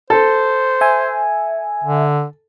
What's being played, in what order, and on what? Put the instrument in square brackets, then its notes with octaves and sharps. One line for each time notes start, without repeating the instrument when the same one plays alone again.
[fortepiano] A4 [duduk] C5
[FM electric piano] E5 G#5
[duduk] D3